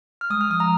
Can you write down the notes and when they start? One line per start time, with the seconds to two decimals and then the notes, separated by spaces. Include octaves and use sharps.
0.21 F6
0.30 G#3 D#6
0.41 F6
0.50 F3 D#6
0.60 A#5